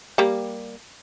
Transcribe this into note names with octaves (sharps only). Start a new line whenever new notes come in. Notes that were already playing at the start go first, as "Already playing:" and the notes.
G3 A#3